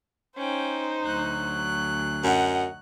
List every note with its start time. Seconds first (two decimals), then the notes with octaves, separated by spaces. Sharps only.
0.36 C#4 D#4 C5 G5
1.02 D2 F#3 F#6
2.24 F#2 D#5 F#5